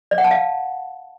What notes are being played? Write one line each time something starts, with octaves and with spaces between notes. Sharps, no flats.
D5
F#5
A5
F5